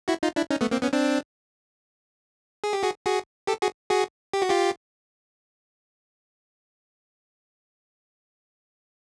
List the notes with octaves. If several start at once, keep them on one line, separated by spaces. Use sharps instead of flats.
E4 F#4
D#4 F4
D4 E4
C#4 D#4
A3 B3
A#3 C4
B3 C#4
C4 D4
G#4
G4
F#4 G#4
F#4 G#4
G4 A4
F#4 G#4
F#4 G#4
G4
F#4
F4 G4